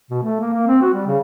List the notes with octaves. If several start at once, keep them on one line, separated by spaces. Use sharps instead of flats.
B2
A3
A#3
A#3
C4
F#4
G3
C#3